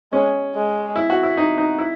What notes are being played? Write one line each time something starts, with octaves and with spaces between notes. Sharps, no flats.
G#3 C#4
G#3
E4
F#4
E4
D#4
D#4
E4